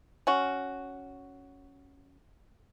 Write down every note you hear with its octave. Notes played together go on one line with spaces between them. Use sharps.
C#4 F#4